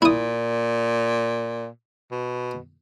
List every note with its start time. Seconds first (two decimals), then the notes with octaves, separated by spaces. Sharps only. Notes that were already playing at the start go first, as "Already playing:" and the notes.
0.02 A#2 E4 D#6
2.11 B2